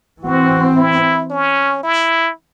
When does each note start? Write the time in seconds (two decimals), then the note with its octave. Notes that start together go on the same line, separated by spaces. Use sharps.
0.23 E3 C4 F#4
0.76 E4
1.30 C#4
1.83 E4